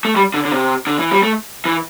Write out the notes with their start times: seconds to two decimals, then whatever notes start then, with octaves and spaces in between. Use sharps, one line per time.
0.05 A3
0.16 G3
0.34 D3
0.45 D3
0.52 C3
0.87 D3
0.99 E3
1.11 G3
1.23 A3
1.65 E3